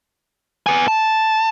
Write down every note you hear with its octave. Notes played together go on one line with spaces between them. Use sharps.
B3 G#5
A5